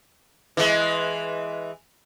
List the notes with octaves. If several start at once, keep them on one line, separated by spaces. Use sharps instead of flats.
E3 G#3